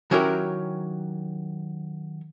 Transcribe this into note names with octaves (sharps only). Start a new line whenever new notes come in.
D#3 F#3 C#4 E4 G4 A#4